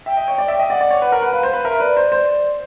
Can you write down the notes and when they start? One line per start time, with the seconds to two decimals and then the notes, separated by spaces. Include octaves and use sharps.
0.06 E5 G5
0.17 D#5
0.28 C#5
0.38 D5
0.48 E5
0.59 D#5
0.70 D5 F#5
0.81 D5
0.91 C#5
1.02 B4
1.12 A#4
1.22 B4
1.33 B4 F5
1.43 C5
1.54 B4
1.65 A#4 E5
1.80 B4 D5
1.97 C5
2.12 C5